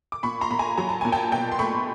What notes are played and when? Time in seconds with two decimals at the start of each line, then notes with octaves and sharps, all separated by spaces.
0.12 D6
0.23 A#2 B5 C#6
0.41 A#5 C6
0.51 A#2 B5
0.59 G#5 A#5
0.77 F#3 A#5
0.89 A5
1.01 A#2 G#5
1.12 G5 A5
1.32 B2 G5 A5
1.51 C6
1.59 A3 B5 C#6